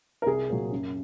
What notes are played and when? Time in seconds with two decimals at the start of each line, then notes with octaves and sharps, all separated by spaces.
0.22 A#4
0.26 C2 G#4
0.50 A#2 F#3
0.71 F#2